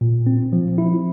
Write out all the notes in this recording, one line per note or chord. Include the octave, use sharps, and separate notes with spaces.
A#2
C4
F3
E4